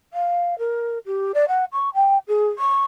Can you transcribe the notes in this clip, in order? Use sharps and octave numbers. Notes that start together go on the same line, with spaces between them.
F5
A#4
G4
D5
F#5
C#6
G5
G#4
C#6